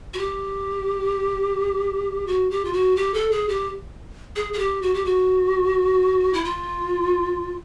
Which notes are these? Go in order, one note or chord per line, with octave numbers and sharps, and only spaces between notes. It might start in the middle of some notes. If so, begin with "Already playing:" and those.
F#4
G4
F#4
G4
F4
F#4
G4
A4
G#4
G4
G#4
G#4
G4
F#4
G4
F#4
E4
F4